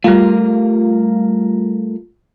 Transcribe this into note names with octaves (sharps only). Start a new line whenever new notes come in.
G3 A3 F4 A#4 F5